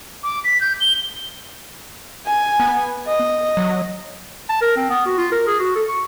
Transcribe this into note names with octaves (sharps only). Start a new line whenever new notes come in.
D6
B6
G6
G7
G#5
B3
D#5
F#3
A5
A#4
C4
B3
F#4
F4
A#4
G#4
F#4
A4
C#6